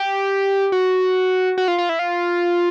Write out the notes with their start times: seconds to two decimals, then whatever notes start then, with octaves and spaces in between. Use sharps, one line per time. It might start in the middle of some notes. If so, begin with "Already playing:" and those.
Already playing: G4
0.72 F#4
1.58 F#4
1.68 F4
1.78 F4
1.89 E4
1.99 F4